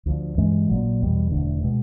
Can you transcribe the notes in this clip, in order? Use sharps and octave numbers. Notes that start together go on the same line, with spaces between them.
D2 D3 F3
G2 E3 G#3 C#4
A#1 A#2 F#3
E2 B2 G3
E1 D2 D3
B2 G#3